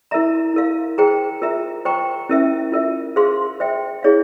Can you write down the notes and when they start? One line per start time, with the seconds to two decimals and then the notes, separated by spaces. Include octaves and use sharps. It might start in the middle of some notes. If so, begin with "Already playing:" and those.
0.11 E4 A#4 E5 A#5
0.54 E4 A#4 F5
0.98 G#4 C5 G5 A#5
1.42 F4 A#4 E5 A#5
1.85 C5 G5 A#5 C#6
2.29 C#4 E4 A#4 E5
2.72 F4 A#4 E5
3.16 G#4 C5 F5 C6
3.60 C5 E5 G5
4.03 E4 G#4 C#5 F5